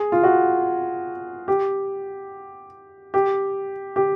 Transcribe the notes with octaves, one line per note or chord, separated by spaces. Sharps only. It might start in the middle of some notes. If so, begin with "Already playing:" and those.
Already playing: G#4
F4
F#4
G4
G4
G4